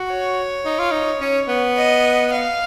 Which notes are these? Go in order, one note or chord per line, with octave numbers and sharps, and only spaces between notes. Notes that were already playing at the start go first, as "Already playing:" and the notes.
Already playing: F#4
C#5
D#4
F4
D#4
C#4
B3
D#5
F5